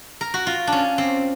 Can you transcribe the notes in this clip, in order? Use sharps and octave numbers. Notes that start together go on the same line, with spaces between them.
A#4
F#4
F4
D4
C#4
C4